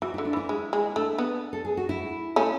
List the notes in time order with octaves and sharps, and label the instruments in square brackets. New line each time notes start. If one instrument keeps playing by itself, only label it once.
[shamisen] E3 [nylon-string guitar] F#4
[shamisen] D3 [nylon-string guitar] E4
[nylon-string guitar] D4
[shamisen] E3 [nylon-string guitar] E4
[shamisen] G#3
G#3
[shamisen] A3 [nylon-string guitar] D4
[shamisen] B3
[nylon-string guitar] A4
G#4
F#4
E4
[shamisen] A3 C#4